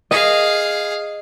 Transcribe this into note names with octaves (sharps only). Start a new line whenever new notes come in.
G#4 D#5 F5